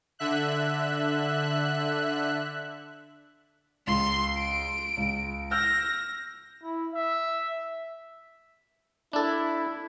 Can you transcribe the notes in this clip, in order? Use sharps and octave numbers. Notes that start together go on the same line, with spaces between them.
D3 E5 F#6
C#2 C6
D7
C#2
E6 F6 G6 A#6
E4
E5
D4 E4 A4